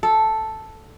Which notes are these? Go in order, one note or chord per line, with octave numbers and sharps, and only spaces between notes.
A4